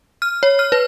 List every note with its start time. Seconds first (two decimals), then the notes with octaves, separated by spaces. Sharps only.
0.22 F6
0.43 C#5
0.59 F6
0.72 B4